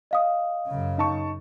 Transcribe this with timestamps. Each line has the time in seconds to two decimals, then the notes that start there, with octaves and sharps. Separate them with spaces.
0.11 D#5 F5 D#6
0.67 F#2 C#3
0.98 D#4 A5 C#6